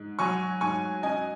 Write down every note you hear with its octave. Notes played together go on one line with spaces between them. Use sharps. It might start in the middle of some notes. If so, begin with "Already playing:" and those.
Already playing: G#2
F#3 G#5 C#6
G#2 G#5 C#6
C#4 D#5 G#5